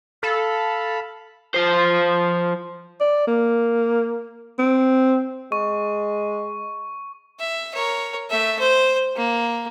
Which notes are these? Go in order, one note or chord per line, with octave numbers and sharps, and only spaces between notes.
A4 F5 B5
F3 C5
D5
A#3
C4
G#3 C#6
E5
A#4 C#5
A3 E5
C5
A#3